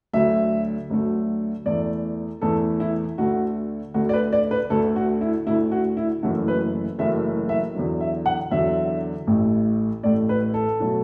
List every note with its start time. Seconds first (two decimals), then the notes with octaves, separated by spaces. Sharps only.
0.13 D2 D3 F#3 A3 E5
0.90 D2 D3 F#3 A3
1.66 E2 E3 A3 D5
2.42 E2 E3 A3 A4
2.80 E4
3.18 D2 D3 A3 F#4
3.94 D2 D3 A3 F#4
4.09 D5
4.13 B4
4.33 D5
4.51 B4
4.70 D2 D3 A3 A4
4.96 F#4
5.21 E4
5.47 D2 D3 A3 E4
5.72 F#4
5.97 E4
6.23 F#1 F#2 E3 A3 F#4
6.48 B4
6.99 F#1 F#2 E3 A3 E5
7.49 E5
7.75 E2 D3 F#3
8.01 E5
8.26 F#5
8.51 E2 D3 F#3 E5
9.27 A1 A2 A3
10.03 A1 A2 A3 D5
10.29 B4
10.54 A4
10.80 B2 F#3 A3